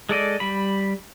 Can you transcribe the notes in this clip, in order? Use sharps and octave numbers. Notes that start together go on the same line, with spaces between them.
G#3 A4 D5 D#5
G3 B5